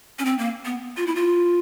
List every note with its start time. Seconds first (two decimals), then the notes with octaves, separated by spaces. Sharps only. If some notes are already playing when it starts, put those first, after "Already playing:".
0.19 C#4
0.25 C4
0.38 A#3
0.65 B3
0.97 F4
1.07 E4
1.15 F4